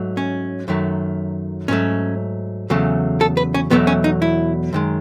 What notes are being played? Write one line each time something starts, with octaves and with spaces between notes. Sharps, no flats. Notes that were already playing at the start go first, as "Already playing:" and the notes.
Already playing: G#2 F#3 A3
C#4
F#2 D#3 F#3 A3
G#2 F#3 A3 C#4
E2 C#3 F#3 A3
A4
B4
C#4
E2 B2 F#3 A3 B3
C#4
D#4
E4
F#2 D#3 G#3